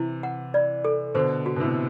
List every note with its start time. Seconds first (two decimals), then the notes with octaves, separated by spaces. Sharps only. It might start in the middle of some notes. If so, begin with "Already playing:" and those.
Already playing: C3 E3 E4
0.23 F#5
0.54 D5
0.85 A4
1.15 B2 D3 C5
1.46 F#4
1.56 B2
1.60 A2 C3